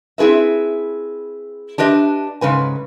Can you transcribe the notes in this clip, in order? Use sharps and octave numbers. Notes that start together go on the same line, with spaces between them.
C4 E4 G#4 B4 E5
D4 G4 B4 D#5 E5
G#2 C#3 B4 G#5